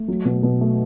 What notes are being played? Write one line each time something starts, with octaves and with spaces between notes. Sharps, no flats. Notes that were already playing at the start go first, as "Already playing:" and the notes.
Already playing: A3
F#3
B2
B2
A3